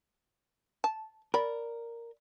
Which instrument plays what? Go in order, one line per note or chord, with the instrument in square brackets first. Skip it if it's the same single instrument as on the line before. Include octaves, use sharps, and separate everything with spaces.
[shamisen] A5
[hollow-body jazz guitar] A#4 [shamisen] D5 B5